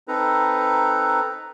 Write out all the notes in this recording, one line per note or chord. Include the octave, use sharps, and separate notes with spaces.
C4 D#4 A4 B4 A#5